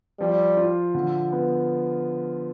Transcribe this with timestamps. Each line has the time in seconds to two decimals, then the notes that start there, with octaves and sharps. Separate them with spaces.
0.19 F3 G3
0.57 F4
0.95 D3
1.32 B3